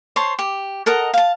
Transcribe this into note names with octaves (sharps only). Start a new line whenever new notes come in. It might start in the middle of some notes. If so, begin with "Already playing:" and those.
C5 C#5 A5 C6
G4
A4 A#4 D#5 F#5
F5 A5